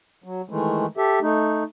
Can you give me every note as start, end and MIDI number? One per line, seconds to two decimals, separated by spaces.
0.24 0.42 54
0.50 0.86 51
0.50 0.86 52
0.50 0.86 56
0.50 0.86 57
0.97 1.19 67
0.97 1.19 69
0.97 1.19 76
1.22 1.64 57
1.22 1.64 63